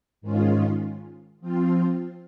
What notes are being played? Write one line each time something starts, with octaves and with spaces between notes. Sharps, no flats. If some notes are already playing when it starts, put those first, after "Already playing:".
G#2 D#3 G#3 C#4 F4
F3 C4 F4